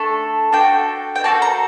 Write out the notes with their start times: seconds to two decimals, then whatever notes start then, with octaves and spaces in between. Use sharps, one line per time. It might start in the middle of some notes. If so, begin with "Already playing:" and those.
Already playing: A3 D4 A4
0.52 D4 F#4 A4 G5
1.16 G5
1.24 A#3 F#4 A4 A5
1.42 A#5